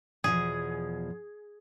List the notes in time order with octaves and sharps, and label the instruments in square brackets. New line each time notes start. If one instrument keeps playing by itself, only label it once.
[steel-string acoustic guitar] E2 B2 F3 [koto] G#4